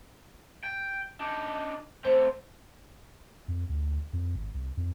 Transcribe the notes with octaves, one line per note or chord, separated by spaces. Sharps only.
G5
D4 D#4
A3 C4 C5
F2
D2
F2
G#1
C2
F2